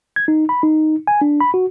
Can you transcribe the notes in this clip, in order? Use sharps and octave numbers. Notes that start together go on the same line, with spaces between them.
G#6
D#4
B5
D#4
G#5
D4
B5
F#4